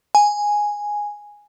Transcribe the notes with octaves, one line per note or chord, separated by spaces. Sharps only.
G#5